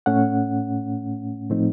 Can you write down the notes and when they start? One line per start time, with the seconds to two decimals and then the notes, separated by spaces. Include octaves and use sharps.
0.06 A2 A3 C#4 F#5
1.50 A2 F3 A3 C4 D#4